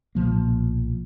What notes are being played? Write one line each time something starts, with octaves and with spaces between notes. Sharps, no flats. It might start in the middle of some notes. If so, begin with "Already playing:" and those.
B1 A#2 F3 A#3